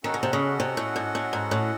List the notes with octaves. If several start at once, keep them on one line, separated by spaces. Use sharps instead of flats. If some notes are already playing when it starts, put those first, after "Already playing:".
D#3 C#4 F#4 A4 D#5 F#5
C#3
C3
C#3
C3
A2
G#2
A2
G#2
A2